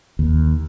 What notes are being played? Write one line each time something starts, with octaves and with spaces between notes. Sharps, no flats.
D#2